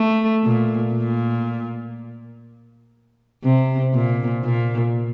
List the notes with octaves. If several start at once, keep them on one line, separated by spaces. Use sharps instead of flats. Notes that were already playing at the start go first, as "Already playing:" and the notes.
Already playing: A3
A#2
A#2
C3
A#2
A#2